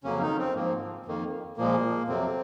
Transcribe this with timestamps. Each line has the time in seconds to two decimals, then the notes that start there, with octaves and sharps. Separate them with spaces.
0.04 F2 C#3 F#3 A#3 C#4
0.21 D#3 D#4
0.38 C4
0.55 G#2 F3 A#3
1.06 F2 D#3 A#3
1.57 A#2 F3 G#3 A#3
2.08 F2 C3 F#3 C4